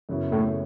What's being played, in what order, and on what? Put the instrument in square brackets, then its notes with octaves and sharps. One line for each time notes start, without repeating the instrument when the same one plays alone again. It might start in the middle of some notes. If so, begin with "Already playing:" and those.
[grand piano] F#2 C#3 F#3 B3 E4
[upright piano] A2 A3